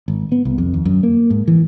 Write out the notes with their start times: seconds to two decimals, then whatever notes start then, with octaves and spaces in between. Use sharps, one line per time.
0.08 G#1
0.32 B3
0.45 C2
0.58 F2
0.74 D#2
0.85 F#2
1.03 A#3
1.30 G#2
1.48 E3